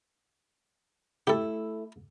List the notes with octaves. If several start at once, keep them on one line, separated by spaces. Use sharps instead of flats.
A3 E4 G4 A4